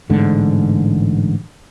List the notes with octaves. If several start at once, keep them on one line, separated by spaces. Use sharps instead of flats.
A1 G#2 D3